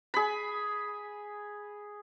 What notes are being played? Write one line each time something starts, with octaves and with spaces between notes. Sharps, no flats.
G#4 B5